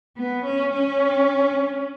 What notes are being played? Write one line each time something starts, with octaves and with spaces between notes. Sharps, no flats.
B3
C#4
C#4